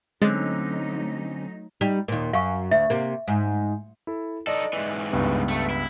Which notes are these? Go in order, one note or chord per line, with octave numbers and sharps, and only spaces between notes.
D3 F#3 G#3 A3 C4 C#4 D#4 A6
G3 D#4
D#2 A#2
F#2 F5 C#6
D2 E5
C3 A#3
G#2
E4 A4
D#4 A4 D5 D#5
G#2 E3
C#2 G2 B3
A3
E4